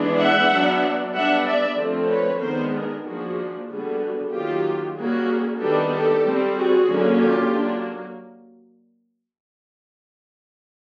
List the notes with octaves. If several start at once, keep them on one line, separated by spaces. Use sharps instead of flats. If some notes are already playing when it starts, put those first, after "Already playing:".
Already playing: E3 G#3 B3 D4
E5 F#5
F#3 B3 D4
G3 B3 D4 E5 F#5
D5 E5
D3 F3 A3 C4
B4 C#5
D#3 G#3 B3 D4 A#4 C5
G#4 A#4
F3 A#3 D4 F#4 G#4
D3 G3 B3 F#4 G#4
D#3 F#3 A#3 F4 G4
G3 A#3 C#4 F#4 G#4
D#3 G3 B3 D4 G4 A4
G4 A4
G3 C4
F#4 G#4
D3 F#3 A#3 C#4
F4 G4
F#3 A#3 D4